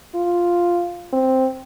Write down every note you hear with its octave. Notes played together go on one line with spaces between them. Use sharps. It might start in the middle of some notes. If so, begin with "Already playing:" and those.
F4
C4